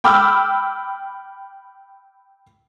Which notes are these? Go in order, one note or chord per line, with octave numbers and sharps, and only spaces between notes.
G5 B5 D6 E6 F6